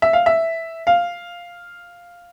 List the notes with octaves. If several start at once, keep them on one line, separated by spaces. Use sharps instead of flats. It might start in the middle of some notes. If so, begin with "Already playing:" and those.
E5
F5
E5
F5